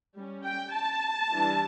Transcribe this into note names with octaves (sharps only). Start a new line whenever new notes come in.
G3 C#4
G5
A5
E3 G3 D4